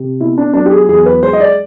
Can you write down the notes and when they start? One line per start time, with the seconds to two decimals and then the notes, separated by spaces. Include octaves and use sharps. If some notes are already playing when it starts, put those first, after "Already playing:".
Already playing: C3
0.20 B2 E4
0.38 D4
0.54 F#3 D4
0.66 G4
0.71 G#4
0.88 E2 G#4
1.06 B4
1.22 G#3 C5
1.33 D#5
1.40 D5